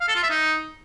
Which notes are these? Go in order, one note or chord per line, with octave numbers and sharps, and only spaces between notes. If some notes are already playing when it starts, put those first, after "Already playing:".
F5
A4
F4
E5
D#4